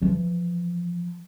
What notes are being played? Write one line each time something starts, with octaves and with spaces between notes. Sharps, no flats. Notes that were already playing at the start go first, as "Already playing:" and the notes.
E3 F3